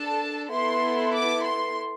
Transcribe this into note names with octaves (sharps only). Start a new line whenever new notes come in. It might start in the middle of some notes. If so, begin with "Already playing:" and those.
Already playing: D4 A4 A5
B3 E4 A4 C6
D6
C6